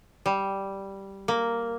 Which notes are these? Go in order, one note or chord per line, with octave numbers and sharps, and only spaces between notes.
G3
A#3